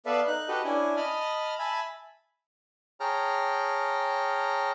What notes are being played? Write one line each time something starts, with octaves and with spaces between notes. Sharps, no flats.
B3 A4 B4 D5 E5 F5
D#4 F#6
F#4 G4 A4 B4 D#5
C#4 D4 E4 G#5
D#5 A5 B5 D#6 F6
E5 G#5 A5 B5
G#4 C#5 G5 A5 A#5 F6